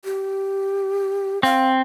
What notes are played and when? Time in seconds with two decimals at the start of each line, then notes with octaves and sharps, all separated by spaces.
0.05 G4
1.43 C4 F5